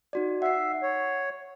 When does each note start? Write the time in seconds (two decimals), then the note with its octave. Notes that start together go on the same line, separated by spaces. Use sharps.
0.13 D#4 F#4 D5
0.42 E5 F#5 C7
0.83 C#5